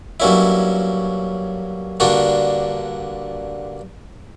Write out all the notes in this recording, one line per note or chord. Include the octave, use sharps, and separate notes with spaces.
G2 F#3 A#3 C#4 E4
G2 D3 A#3 D4 F#4